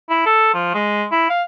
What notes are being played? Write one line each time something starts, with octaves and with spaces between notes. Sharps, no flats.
E4
A4
F3
G#3
E4
F5